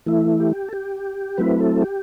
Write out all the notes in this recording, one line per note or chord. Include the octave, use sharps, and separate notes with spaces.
E3 A3 E4
G4
A4
G4
F#3 A3 C4 E4 B4
A4
G4